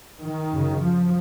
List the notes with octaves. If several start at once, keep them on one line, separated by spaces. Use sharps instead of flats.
D#3
F#2 C#3
F3